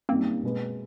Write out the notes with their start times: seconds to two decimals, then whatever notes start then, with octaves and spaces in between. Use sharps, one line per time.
0.09 F#2 D#3 G3 A#3 C4
0.43 B2 G#3 B3